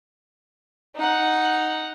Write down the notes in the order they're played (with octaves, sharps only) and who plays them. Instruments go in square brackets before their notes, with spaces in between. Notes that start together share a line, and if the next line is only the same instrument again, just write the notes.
[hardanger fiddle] D#4 F#5